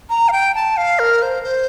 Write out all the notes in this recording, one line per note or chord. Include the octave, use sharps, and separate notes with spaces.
A#5
F5
G5
A5
F5
A#4
C5
C5